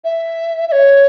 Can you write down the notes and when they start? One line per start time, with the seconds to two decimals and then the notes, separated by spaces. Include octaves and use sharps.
0.04 E5
0.68 E5
0.72 C#5